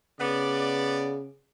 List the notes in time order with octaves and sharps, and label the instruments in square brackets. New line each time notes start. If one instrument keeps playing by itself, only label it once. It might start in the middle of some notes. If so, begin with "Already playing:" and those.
[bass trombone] C#3 [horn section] B3 D5